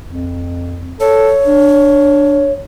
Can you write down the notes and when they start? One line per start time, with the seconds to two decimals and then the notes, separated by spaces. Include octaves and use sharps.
0.07 F2
1.00 A4 C#5
1.46 D4